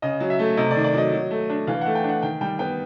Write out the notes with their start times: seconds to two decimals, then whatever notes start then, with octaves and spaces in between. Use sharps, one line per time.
0.02 C#3 D#5
0.20 F#3
0.30 E5
0.39 A3
0.57 C3 D#5
0.71 D5
0.75 D#3
0.84 D5
0.94 F#3 D#5
1.12 F#3
1.31 A3
1.49 D4
1.67 E3 F5
1.81 A3 F#5
1.95 G5
2.04 D4 F#5
2.22 D#3 G5
2.41 G3 G5
2.59 B3 G5